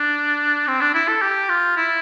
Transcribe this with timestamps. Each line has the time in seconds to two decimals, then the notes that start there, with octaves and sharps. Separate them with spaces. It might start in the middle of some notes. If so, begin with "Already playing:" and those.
Already playing: D4
0.68 C4
0.81 D4
0.94 E4
1.08 A4
1.22 G4
1.49 F4
1.77 E4